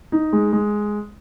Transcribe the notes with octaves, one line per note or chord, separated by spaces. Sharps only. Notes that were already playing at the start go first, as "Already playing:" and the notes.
D#4
G#3
G#3